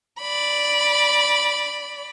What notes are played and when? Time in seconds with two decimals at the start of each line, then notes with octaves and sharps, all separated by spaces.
0.20 D5 B5